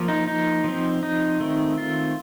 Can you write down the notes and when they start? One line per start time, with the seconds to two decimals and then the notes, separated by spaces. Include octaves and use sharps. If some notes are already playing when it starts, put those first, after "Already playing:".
Already playing: F3 A#3
0.08 D#4
0.27 D#4
0.64 F3 C4
1.03 D#4
1.40 D#3 A3 C4
1.77 F4